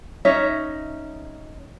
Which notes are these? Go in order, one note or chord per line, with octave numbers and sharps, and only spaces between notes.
C#4 D#4 C#5 E5